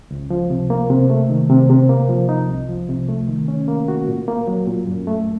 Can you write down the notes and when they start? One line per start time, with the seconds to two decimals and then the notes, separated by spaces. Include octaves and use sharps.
0.11 C#2
0.30 F3
0.50 C3
0.70 A#3
0.90 C3
1.10 A3
1.29 D#3
1.50 C3
1.70 C3
1.89 A#3
2.09 F3
2.29 D#4
2.48 C2
2.69 F3
2.89 C3
3.09 A3
3.28 D#3
3.48 C#4
3.68 A#3
3.88 F#4
4.08 A#2
4.28 A#3
4.47 F#3
4.67 A#2
4.87 F#2
5.07 A3